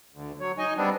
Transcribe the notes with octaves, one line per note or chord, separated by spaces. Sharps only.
D2
F#3 C#5
D#4 D#5 G#5
G3 B3 C4 D4